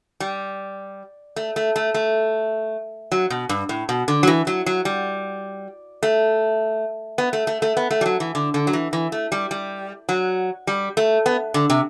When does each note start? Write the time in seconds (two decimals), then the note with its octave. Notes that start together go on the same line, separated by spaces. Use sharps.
0.20 G3
1.36 A3
1.56 A3
1.76 A3
1.94 A3
3.12 F#3
3.30 B2
3.49 G2
3.69 A2
3.89 B2
4.08 D3
4.23 F#3
4.27 E3
4.47 F#3
4.66 F#3
4.85 G3
6.03 A3
7.18 B3
7.33 A3
7.47 A3
7.62 A3
7.77 B3
7.91 A3
8.01 G3
8.06 F#3
8.20 E3
8.35 D3
8.54 D3
8.67 F#3
8.73 E3
8.93 E3
9.12 A3
9.32 G3
9.51 G3
10.09 F#3
10.67 G3
10.97 A3
11.26 B3
11.54 D3
11.70 C3